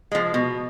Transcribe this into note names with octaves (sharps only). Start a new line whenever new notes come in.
F3 G#3
B2